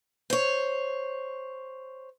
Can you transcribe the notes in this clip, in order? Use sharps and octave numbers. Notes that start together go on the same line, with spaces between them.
C5 C#5